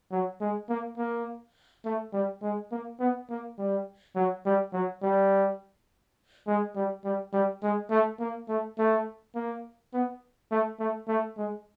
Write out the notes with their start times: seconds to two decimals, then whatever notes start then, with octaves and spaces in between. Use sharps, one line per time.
0.11 F#3
0.41 G#3
0.69 A#3
0.98 A#3
1.85 A3
2.13 G3
2.42 G#3
2.71 A#3
3.00 B3
3.29 A#3
3.58 G3
4.16 F#3
4.45 G3
4.73 F#3
5.02 G3
6.47 G#3
6.75 G3
7.04 G3
7.33 G3
7.62 G#3
7.91 A3
8.20 A#3
8.48 A3
8.78 A3
9.35 A#3
9.94 B3
10.51 A3
10.80 A3
11.08 A3
11.37 G#3